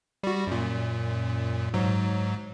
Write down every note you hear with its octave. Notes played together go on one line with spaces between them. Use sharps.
G3 F#4
F#2 A#2
G#2 F#3